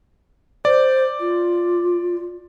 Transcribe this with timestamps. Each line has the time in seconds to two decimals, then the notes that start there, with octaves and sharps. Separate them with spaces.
0.65 C5 D5
1.20 F4